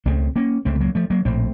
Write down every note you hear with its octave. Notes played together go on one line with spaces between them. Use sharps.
C#2 C#3 A3 C4
A#3 C#4
C#2 C#3 A3 C4
F#3 A#3
F3 A3
F#3 A#3
A#1 A2 A3 C4